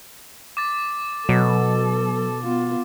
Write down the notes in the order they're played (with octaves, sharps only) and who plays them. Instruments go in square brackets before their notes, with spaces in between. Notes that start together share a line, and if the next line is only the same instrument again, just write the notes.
[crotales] D6 A6
[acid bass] B2 [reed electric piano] F#3 [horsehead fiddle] A4
[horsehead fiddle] B3 F4